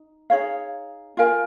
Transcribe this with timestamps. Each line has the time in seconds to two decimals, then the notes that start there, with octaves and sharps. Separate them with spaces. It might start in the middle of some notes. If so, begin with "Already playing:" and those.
Already playing: D#4
0.30 D#4 G#4 C#5 F5
1.17 F4 A#4 F5 G#5